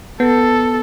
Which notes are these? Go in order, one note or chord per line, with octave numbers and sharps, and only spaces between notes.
B3 A4